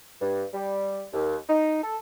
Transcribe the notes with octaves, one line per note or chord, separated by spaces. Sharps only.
G2
G3
D#2
D#4
A4